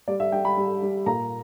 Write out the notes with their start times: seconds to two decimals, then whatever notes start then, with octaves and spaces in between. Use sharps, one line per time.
0.08 G3 D5
0.20 E5
0.32 G3 G5
0.45 B5
0.57 G3
0.82 G3
1.06 A#2 A#5